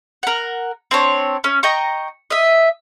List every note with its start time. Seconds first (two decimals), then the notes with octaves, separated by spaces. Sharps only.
0.23 A#4 F#5
0.91 C4 D4 C#5
1.44 C#4
1.63 D#5 G5 A#5 C#6
2.30 D#5 E5